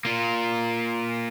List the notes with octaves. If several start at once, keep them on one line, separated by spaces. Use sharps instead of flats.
A#3 F4